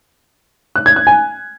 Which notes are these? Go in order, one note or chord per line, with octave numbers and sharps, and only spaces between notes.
F#6
G#6
F#6
G#5